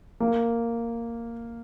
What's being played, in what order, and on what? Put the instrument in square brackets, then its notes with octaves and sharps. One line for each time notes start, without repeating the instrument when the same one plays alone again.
[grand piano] A#3